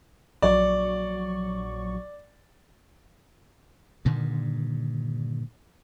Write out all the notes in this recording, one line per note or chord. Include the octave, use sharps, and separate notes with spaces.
A#1 F#3 D5 C#6
G2 A#2 D3 D#3